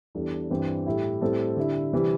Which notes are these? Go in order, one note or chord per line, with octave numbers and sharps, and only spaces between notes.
E2 E3 G3 D4 A4
G2 E3 C4 G4
A2 G3 E4 G4
A2 G3 C4 A4
D3 G3 E4
C3 E3 G3 C4